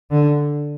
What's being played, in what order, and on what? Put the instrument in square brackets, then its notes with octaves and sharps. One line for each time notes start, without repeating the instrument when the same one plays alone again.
[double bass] D3